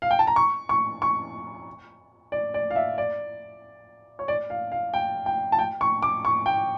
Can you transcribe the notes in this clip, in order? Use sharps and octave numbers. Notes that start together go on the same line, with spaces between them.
F5
G5
A5
A#5
C#6
C#6
C#6
D5
D5
F5
E5
D5
C#5
D5
F5
F5
G5
G5
A5
G5
C#6
D6
C#6
G5